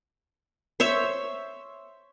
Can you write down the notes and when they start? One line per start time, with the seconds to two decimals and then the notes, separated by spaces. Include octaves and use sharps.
0.80 C5 C#5 E5